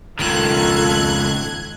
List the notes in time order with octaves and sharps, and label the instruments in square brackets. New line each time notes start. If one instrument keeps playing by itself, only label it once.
[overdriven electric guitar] C#2 D#3 [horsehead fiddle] F4 A4 [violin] F#6 G#6